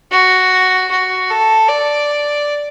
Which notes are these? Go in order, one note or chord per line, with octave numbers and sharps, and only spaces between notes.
F#4
F#4
A4
D5